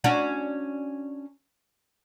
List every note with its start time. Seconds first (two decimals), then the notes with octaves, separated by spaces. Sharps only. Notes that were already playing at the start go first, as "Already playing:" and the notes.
0.04 C#4 D4 F#4